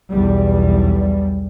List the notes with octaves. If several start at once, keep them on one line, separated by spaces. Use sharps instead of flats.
B1 E2 G3